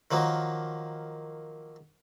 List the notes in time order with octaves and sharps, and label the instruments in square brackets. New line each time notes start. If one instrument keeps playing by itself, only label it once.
[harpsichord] D#3 F3 F#3 A#3